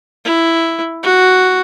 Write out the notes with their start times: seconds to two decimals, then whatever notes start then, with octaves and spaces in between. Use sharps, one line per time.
0.25 E4
1.03 F#4